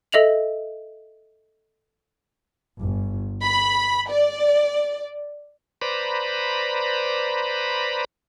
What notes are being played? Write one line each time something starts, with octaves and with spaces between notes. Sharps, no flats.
A4 D#5 E5 F7 F#7
G1
B5
D5
B4 C5 D5 A#5 B5